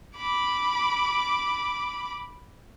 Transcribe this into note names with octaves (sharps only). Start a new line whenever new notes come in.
B5 D6